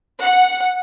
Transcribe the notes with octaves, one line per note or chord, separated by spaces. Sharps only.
F#5